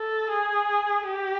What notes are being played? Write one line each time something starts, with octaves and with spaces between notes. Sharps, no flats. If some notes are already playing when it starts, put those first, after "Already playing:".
Already playing: A4
G#4
G4